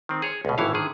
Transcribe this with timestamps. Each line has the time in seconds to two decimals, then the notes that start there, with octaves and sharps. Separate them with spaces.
0.09 D#3 C4
0.22 G#4 C#5
0.45 C#2 B2
0.58 G#1 A2 E3 E4 C#5 F5
0.74 D3 D#3 G#4